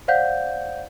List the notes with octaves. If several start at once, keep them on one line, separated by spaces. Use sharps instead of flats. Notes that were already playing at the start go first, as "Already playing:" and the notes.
C5 D5 F5 F#5 G6